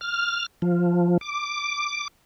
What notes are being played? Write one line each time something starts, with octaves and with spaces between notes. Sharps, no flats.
F6
F3
D6